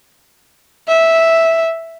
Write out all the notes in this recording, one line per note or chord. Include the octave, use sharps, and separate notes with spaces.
E5